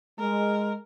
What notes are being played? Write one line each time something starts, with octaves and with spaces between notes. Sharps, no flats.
G#3 A#4